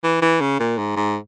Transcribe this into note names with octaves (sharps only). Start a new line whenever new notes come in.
E3
E3
C#3
A#2
G#2
G#2